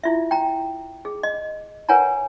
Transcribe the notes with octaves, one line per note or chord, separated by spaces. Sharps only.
E4 F4 E5
G5 A#5
G#4
D#5
A#4 B4 C#5 F#5 G#5 A#5